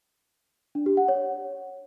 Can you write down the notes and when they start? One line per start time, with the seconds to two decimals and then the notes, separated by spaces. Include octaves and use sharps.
0.75 D4
0.86 G4
0.97 F#5
1.08 C#5